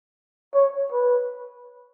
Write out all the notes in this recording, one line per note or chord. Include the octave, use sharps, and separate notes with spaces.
C#5
B4